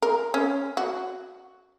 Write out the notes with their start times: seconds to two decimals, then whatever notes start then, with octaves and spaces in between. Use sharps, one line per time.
0.02 A#4
0.34 C#4
0.77 F#4